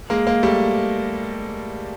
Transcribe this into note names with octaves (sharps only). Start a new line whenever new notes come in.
G#3 A#3
G#3 A#3
G3 A3